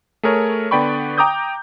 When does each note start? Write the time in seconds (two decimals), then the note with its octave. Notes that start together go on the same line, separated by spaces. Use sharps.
0.23 A3 G#4 A#4 C#5
0.71 D3 B3 D5 G5 B5 C#6
1.18 G5 A#5 D6 D#6 G6